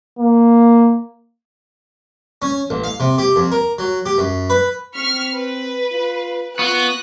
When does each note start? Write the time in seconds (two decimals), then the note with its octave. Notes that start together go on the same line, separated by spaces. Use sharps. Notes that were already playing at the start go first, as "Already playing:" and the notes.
0.19 A#3
2.42 C#4
2.70 A1
2.84 F5
3.00 C3
3.18 G4
3.36 F2
3.52 A#4
3.79 F#3
4.06 G4
4.18 F#2
4.50 B4
4.96 C4 C#6 F6 B6
5.35 B4
5.92 F4
6.59 B3 F4 C#6 F#6 A#6